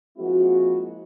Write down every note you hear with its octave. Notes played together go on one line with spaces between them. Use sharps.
F3 G#3 A#3 C4 E4 F#4